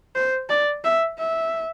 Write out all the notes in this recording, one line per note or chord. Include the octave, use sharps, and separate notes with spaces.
C5
D5
E5
E5